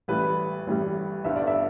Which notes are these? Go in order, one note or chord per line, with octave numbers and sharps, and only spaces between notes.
A1 A2 G3 B4
A1 A2 G3
G1 G2 D3 E5
D5
E5